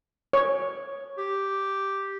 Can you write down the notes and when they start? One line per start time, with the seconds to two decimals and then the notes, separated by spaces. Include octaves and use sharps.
0.33 C#5
1.18 G4